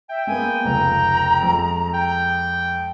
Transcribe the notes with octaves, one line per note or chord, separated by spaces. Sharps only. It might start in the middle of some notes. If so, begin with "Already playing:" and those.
E5 G5
G#3 A#3 B3 G#5
F1 C#2 A#5
F2 G#3
G5